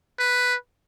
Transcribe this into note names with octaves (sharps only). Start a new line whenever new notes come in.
B4